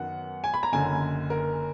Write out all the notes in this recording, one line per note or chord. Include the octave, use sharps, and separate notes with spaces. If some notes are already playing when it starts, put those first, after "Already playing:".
Already playing: F#2 D#3 F#3 B3 F#5
G#5
B5
A#5
F#1 F#2 D3 G#5
A#4